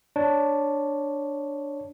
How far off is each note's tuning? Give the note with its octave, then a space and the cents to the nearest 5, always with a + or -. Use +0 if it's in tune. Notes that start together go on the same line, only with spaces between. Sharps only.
D4 +0 C#5 +0